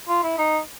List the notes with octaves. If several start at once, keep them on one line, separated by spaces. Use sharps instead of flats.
F4
E4
D#4